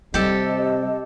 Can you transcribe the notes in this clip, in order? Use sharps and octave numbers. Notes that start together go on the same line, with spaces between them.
C3 G3 G4 A4 D#5